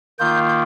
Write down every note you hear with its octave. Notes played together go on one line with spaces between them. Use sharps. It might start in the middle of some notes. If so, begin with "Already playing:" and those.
D#3 A#3 F4 G6
G6